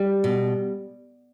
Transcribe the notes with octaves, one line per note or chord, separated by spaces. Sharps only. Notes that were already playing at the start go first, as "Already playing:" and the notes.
Already playing: G3
B2